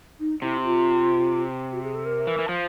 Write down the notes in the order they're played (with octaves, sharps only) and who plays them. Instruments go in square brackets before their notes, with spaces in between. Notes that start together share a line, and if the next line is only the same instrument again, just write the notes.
[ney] D#4
[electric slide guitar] C3 [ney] E4
[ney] F4
F#4
G#4
A4
A#4
[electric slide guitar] E3
E3
F3